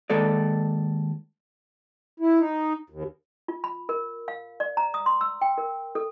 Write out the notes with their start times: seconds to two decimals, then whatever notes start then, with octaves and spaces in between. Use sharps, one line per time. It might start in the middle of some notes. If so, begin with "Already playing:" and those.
0.10 D#2 G#3 A4 D5
2.19 E4
2.39 D#4
2.90 D#2
3.48 F4
3.64 B5
3.89 A#4
4.28 F5
4.60 D5
4.77 A#5
4.94 D#6
5.06 C6
5.21 E6
5.42 G5
5.58 A#4
5.95 A4